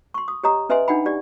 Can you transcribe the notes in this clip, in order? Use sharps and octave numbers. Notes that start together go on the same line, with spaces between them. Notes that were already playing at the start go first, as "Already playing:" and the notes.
C6 C#6
D#6
G4 C#5 D#5 A#5 D#6
C#4 B4 D#5 E5 G#5 C6
D4 D#4 F#5 G5 B5
G4 D5